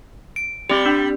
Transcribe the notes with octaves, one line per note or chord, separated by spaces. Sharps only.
D7
G3 C4 G4
D4